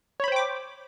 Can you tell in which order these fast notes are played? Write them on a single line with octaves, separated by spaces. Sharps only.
C#5 B5 C5 G5 D6